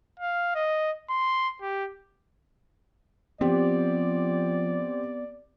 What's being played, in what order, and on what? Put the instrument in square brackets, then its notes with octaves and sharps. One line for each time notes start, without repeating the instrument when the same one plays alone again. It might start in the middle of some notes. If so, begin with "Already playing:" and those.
[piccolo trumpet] F5
D#5
C6
G4
[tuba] F3 [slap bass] B3 [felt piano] C4 G4 [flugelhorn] D5